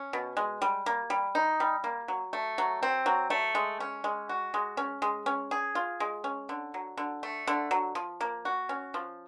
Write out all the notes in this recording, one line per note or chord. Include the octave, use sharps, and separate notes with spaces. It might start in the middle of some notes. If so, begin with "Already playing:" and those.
Already playing: C#4
B2
G#3
G3
A#3
G3
D#4
G3
A#3
F#3
A3
F#3
C4
F#3
A3
G#3
C#4
G#3
F#4
G#3
C#4
G#3
C#4
G#4
F4
G#3
C#4
D3
F#3
D3
A3
D3
F#3
F3
A#3
F#4
C#4
F3